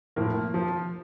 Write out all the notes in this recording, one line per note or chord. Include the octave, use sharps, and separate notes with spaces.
A2 F3 A#3
F3